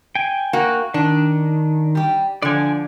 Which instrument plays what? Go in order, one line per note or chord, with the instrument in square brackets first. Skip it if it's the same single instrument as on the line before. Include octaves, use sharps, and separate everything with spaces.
[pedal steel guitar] G5 G#5
[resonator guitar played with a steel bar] A#3 F#4
[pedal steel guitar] D#3 [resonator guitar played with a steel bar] D4
[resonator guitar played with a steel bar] G3 G4
[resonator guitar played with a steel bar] D3 F3 [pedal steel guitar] D5 G#5